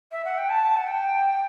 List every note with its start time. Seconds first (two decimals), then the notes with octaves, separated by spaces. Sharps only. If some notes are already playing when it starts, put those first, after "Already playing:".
0.12 E5
0.25 F#5
0.38 G5
0.50 A5
0.77 F#5
0.87 G5